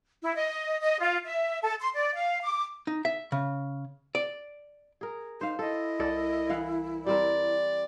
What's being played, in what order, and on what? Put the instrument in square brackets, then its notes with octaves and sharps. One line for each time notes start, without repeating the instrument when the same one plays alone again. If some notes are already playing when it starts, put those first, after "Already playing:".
[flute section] E4
D#5
D#5
F4
E5
A4
C6
D5
F5
D6
[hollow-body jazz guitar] D#4
E5
C#3
D5
[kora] G#4 A#4
[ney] D#4 [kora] C5 F5
[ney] E4 [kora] A4 [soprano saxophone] D#5
[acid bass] C2 [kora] A4 D5
[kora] E3 F5 F#5
[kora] G3 C4 A#4 [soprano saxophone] D5